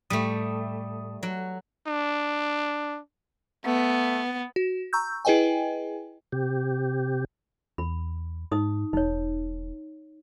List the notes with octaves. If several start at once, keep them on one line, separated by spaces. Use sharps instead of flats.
A2 G3 A3 D#6
F#3
D4
A3 B3
F#4
A#5 C#6 E6 G6
E4 G#4 B4 D#5 G5 G#5
C3 G4
E2 B5
G#2 D#4 D#6
E1 D#4 C#5